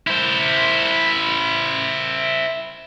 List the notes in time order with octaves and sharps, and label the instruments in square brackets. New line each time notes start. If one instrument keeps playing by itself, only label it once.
[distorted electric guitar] E4 C5